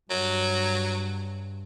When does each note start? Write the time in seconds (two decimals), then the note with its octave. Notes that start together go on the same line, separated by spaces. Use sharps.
0.11 G2 F#3